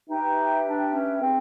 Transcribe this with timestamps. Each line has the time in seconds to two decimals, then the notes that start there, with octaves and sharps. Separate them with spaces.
0.08 D#4 G4 B4 E5 G5
0.65 D4
0.93 C#4
1.22 C4 D#4 G#4 B4